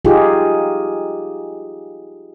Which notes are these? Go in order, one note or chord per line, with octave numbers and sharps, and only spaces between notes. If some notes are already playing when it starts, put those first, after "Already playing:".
D#4 F4 G4 G#4